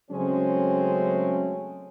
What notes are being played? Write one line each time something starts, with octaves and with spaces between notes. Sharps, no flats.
C#3 F#3 G#3 A3 C4 C#4